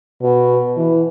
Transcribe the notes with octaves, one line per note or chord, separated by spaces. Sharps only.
B2
E3